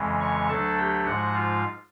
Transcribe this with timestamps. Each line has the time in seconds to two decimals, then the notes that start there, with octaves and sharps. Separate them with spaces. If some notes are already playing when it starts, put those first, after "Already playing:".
Already playing: F2 C#3 E3 G#3
0.21 C#5 C#6
0.48 D2 D3 F#3 A3 D4 A4 A5
0.77 G4 G5
1.06 G#2 F3 G#3 F#4 F#5
1.34 F4 F5